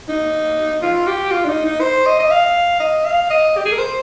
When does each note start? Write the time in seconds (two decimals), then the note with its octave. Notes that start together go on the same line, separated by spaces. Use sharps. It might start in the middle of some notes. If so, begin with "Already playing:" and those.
0.09 D#4
0.82 F4
1.07 G4
1.31 F4
1.45 D4
1.48 D#4
1.65 D#4
1.81 C5
2.06 D#5
2.19 D#5
2.31 F5
2.80 D#5
3.05 F5
3.30 D#5
3.57 G4
3.65 G#4
3.72 A#4
3.79 C5